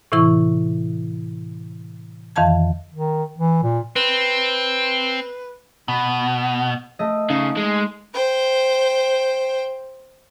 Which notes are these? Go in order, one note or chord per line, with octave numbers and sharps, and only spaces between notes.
A2 C3 E3 E4 C#6
F2 D#3 E3 F5 A5 G#6
D#3
E3
A#2
C4 B4
B2
A3 D#5
C#3 D#4
G#3
C5 G5